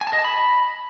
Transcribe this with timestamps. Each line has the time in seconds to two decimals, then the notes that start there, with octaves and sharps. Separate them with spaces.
0.01 G#5
0.07 A5
0.13 D#5
0.19 A5
0.24 B5